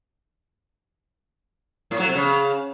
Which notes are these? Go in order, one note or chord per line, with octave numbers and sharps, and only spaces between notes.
A2
F#3
C3
C#3